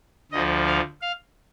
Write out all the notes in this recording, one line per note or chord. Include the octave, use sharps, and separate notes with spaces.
D2 D3 F3 D#5
F5
F5